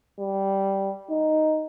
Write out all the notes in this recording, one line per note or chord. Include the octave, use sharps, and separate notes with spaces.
G3
D#4